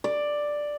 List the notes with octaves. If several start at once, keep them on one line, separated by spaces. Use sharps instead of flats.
D5